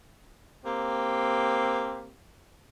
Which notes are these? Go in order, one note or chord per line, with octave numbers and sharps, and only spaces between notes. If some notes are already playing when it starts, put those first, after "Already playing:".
A#3 C4 G4